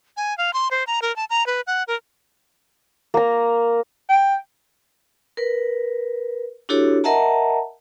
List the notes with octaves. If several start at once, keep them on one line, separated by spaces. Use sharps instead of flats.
G#5
F5
C6
C5
A#5
A#4
A5
A#5
B4
F#5
A#4
A#3 A#5
G5
A#4 B4
D4 E4 F#4 G4 A4 C#5
A#4 D#5 E5 F#5 A5 A#5